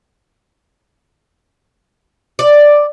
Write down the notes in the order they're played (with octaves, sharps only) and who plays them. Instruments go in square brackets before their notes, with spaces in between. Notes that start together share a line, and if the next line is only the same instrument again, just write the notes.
[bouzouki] D5